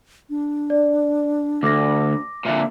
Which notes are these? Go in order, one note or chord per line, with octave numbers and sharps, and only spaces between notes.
D4
D5
D2 D6 A#6
A#2 D3 E5